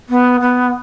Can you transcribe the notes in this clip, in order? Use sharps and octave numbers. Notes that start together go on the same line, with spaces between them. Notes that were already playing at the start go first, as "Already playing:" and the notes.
B3
B3